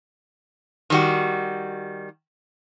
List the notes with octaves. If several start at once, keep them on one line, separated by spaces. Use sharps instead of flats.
D#3 G3 F#4